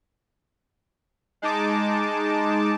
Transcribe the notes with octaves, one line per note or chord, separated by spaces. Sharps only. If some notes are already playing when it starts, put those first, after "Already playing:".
G#3 D#4 A5 D6